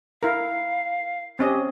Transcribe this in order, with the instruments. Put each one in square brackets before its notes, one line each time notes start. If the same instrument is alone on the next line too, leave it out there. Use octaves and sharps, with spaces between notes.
[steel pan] E4 A#4 [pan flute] F5
[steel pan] C4 C#4 D#5 [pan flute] G4